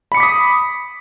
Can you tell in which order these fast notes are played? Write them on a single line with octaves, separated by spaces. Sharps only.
B5 C#7 D6 B6 D#6